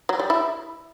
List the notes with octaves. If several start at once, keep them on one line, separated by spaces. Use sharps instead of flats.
F#3
G3
E4